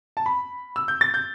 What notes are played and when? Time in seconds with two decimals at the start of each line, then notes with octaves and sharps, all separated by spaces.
0.17 A5
0.26 B5
0.76 E6
0.88 G6
1.01 A6
1.14 G6